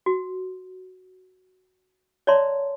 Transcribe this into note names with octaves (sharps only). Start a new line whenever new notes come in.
F#4
C#5 D5 E5 A5 A#5 C6